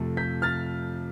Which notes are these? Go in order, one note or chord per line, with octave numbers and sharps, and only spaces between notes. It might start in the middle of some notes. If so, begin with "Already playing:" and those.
Already playing: F2 C3 F3 A3
G6 B6
F6 A6